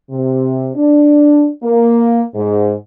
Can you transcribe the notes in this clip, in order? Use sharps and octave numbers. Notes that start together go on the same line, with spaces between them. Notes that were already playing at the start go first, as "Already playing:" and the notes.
C3
D4
A#3
G#2